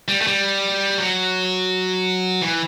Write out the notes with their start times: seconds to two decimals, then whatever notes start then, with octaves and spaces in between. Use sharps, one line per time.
0.08 G3
0.21 A3
0.27 G3
0.98 F#3
2.42 E3